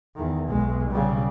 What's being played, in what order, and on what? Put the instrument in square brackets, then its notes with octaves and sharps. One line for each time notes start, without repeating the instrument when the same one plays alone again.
[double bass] E2 D#3
[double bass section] B1 [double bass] G#3
[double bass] C#3 G3